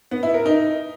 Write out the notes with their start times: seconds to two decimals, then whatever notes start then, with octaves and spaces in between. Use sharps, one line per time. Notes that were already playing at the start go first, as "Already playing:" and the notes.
0.11 B3
0.23 E4
0.34 A#4
0.46 D#4